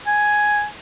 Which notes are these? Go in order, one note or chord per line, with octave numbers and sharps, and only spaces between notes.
G#5